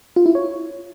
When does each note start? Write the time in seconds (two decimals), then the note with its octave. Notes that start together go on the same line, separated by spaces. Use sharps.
0.16 F4
0.26 E4
0.35 C#5